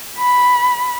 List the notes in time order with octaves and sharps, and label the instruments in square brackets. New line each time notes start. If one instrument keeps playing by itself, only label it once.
[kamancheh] B5